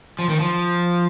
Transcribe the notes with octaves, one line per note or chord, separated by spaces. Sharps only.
F3
D#3
F3